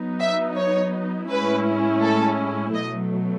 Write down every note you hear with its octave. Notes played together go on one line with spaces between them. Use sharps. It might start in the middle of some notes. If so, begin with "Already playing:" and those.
Already playing: F#3 B3 D#4
E5
C#5
A2 G#3 C#4 E4 B4
A4
B2 F#3 A3 D#5